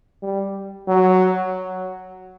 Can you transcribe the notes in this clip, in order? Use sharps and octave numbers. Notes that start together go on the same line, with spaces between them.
G3
F#3